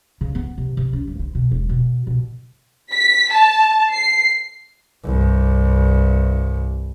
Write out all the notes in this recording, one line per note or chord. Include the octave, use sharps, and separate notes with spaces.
C#3
B3
C3
C3
C#4
G2
C4
B2
E1
B2
B2
B6
A5
C7
C2 G2